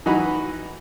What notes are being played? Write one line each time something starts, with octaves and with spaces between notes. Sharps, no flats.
E3 D#4 F#4 B5